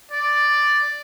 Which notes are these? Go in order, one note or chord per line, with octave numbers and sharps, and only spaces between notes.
D5